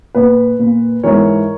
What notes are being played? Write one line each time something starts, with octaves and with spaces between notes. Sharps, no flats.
A#2 B4
A#2
G#2 E3 A#4 C#5